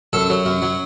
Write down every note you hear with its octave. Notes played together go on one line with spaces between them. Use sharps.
F#2 A4
F#3
F#2
F#3